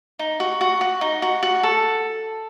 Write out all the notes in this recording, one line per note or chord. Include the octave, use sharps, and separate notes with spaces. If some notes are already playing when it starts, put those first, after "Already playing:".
D#4
F#4
F#4
F#4
D#4
F#4
F#4
A4